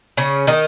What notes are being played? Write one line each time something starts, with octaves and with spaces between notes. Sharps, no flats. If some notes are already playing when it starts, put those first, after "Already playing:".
C#3 C#4
D#3 D#4